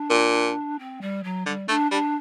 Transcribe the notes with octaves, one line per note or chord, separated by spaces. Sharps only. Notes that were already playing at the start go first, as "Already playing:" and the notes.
Already playing: D4
A#2
C4
G3
F#3
D3 G3
A3 D4
G3 D4